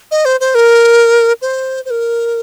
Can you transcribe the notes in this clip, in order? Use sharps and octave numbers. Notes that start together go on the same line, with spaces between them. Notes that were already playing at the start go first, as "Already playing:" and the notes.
D#5
C5
C5
A#4
C5
C5
A#4